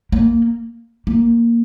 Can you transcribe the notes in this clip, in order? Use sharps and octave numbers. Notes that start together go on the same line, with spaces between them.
A#3
A#3